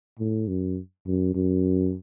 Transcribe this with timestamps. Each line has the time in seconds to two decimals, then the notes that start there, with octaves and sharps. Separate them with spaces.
0.19 A2
0.48 F#2
1.06 F#2
1.35 F#2